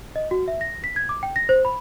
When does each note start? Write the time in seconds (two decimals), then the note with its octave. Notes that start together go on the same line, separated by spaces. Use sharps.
0.16 D#5
0.31 F#4
0.48 E5
0.61 A#6
0.84 B6
0.96 G#6
1.09 D6
1.23 G5
1.36 A#6
1.49 C5
1.65 B5